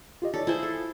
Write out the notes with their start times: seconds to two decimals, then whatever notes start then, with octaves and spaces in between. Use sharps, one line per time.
0.22 F4 G4 D#5
0.34 D#4 A4 C#5 D5
0.47 E4 F4 G#4 C5
0.63 A4